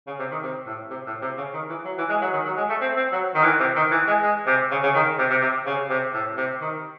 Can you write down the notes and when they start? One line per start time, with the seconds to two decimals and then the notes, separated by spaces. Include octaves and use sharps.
0.07 C#3
0.19 C3
0.31 D#3
0.43 C3
0.67 A2
0.90 C3
1.07 A2
1.22 C3
1.37 C#3
1.54 D#3
1.69 E3
1.85 F#3
1.98 E3
2.09 G#3
2.21 F#3
2.33 D#3
2.45 F#3
2.57 G#3
2.69 A3
2.81 C4
2.97 C4
3.12 F#3
3.35 D#3
3.44 E3
3.60 C3
3.76 D#3
3.91 E3
4.07 G#3
4.23 G#3
4.47 C3
4.71 C#3
4.83 C#3
4.95 D#3
5.19 C3
5.30 C3
5.42 C3
5.66 C#3
5.90 C3
6.14 A2
6.37 C3
6.61 D#3